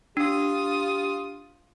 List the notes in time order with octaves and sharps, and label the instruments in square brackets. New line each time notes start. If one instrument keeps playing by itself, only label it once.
[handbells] D4 [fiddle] F4 D#6 [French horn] G4